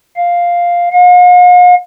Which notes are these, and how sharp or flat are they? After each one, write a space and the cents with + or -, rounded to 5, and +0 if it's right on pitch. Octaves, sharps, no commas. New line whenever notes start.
F5 +0
F5 +45